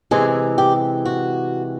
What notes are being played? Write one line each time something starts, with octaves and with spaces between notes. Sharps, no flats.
C3 E3 G#3 G#4
G4
F#4